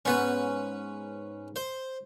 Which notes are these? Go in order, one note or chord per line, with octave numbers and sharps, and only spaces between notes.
G#2 B3 C#4 B4
C5